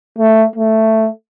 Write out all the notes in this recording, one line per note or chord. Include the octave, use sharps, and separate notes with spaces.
A3
A3